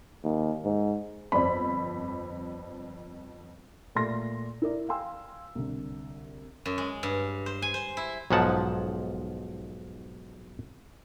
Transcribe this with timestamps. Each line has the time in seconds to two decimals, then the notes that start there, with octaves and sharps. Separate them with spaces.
0.24 D#2
0.64 G#2
1.32 G1 F2 C5 D5 B5
3.95 A#2 A3 A4 D5 C6 A#6
4.62 E4 A#4 D5
4.89 F5 G5 G#5 C6 E6
5.55 C2 D3
6.66 F#2
6.78 G#3
7.03 G2
7.46 C5
7.62 G#5
7.74 C5
7.97 E4
8.31 B1 G#2 F3 G#3 F#5 A5